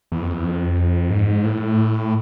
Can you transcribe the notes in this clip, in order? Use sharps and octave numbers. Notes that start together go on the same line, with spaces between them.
E2
F2
E2
F2
G#2
A2